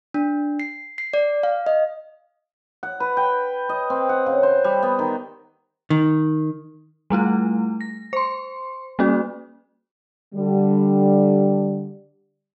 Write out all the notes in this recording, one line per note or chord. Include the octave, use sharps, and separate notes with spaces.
D4
C7
C7
D5
F5
D#5
F#5
B4
G5
D#5
C4
F#5
C#3
C5
G3
B3
D#3
D#3
G3 A3 E4 F4
A#6
C5 C6
G3 A#3 C#4 F#4
D3 G3